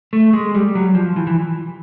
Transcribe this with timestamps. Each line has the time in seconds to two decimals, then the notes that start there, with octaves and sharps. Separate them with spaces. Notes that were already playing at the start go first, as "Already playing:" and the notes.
0.13 A3
0.33 G#3
0.55 G3
0.75 F#3
0.95 F3
1.16 E3
1.27 E3